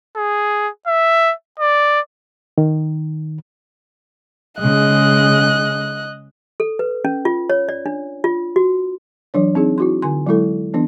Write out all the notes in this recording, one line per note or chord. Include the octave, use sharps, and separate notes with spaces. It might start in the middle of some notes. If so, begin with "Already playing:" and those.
G#4
E5
D5
D#3
C#3 G#3 D#5 F#6
A4
B4
C#4
F4
C#5
D5
D4
F4
F#4
E3 F#3 D4 C#5
C4 D#4 G#4
E4 F#4 C6
D3 G#5 C6
F#3 G#3 E4 A4
E3 B3 D4